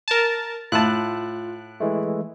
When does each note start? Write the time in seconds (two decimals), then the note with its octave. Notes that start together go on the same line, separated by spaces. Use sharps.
0.08 A#4 A5
0.72 A2 F4 A5 F#6
1.80 E3 G#3 A3